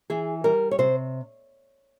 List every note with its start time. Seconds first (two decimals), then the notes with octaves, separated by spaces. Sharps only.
0.10 E3 G#4
0.44 G3 A#4
0.71 C#5
0.79 C3 C5